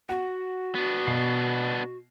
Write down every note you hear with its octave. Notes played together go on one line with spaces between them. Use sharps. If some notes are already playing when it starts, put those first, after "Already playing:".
F#4 F#5
B3 D4
B2 C7